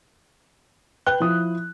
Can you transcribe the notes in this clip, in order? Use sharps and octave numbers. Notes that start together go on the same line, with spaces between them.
B4 G5 F#6 G7
F3 E4 D#6